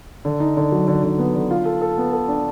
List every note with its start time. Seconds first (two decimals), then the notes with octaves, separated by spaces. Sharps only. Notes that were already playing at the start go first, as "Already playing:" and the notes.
0.25 D3
0.40 D#4
0.57 D3
0.72 F#3
0.88 D3
1.04 D3
1.19 B3
1.35 D3
1.51 F4
1.65 A4
1.81 A4
1.98 B3
2.13 A4
2.28 D4